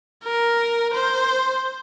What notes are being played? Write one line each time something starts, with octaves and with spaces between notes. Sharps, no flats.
A#4
C5